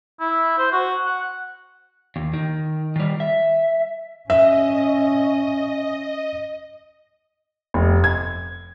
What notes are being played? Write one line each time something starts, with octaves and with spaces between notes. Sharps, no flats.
E4
C5
F#4
F#5
D#2
D#3
D#3 G3
E5
C#4 D#5 E5
F1
G#6